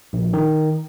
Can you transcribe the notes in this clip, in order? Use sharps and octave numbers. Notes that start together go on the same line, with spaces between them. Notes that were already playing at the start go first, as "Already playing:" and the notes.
A#1
D#3